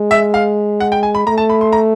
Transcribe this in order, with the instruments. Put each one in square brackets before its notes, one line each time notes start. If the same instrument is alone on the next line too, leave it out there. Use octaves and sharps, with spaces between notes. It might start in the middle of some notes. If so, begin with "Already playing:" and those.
Already playing: [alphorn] G#3
[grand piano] E5
F5
F#5
G5
G#5
B5
[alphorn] A3 [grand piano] A#5
[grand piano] A5
B5
C6
A#5